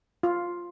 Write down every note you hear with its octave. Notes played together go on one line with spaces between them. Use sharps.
F4